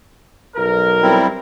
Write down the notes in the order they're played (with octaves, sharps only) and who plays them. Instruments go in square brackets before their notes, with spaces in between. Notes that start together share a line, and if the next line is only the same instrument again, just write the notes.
[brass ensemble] B1 A#4
[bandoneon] G3 C4 E4